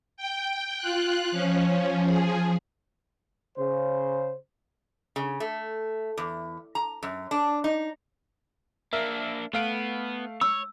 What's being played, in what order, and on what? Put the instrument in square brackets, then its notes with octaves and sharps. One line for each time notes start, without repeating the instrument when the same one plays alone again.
[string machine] G5
F4 F#6
F3 C#4
F3 G#4
[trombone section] C#3 C5
[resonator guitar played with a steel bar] C#3
A3
E2
A#5
F#2
D4
D#4
[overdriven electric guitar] A#3 D4 [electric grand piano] A#4 E5
[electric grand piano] A3 F5 D7 [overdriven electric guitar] B3
[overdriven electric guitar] C#5 [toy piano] E6